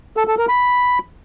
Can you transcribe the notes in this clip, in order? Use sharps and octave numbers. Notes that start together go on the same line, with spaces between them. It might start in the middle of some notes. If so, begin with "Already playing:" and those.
A4
A4
A#4
B5